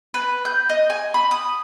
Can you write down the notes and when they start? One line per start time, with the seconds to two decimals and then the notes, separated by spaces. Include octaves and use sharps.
0.14 B4
0.45 G6
0.69 D#5
0.90 G#5
1.14 B5
1.31 D#6